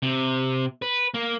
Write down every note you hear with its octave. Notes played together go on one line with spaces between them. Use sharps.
C3
B4
A#3